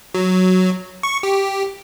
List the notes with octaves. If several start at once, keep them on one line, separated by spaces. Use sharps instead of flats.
F#3
C#6
G4